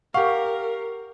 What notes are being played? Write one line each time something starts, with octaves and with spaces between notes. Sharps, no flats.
G4 A#4 F5 F#5 C#6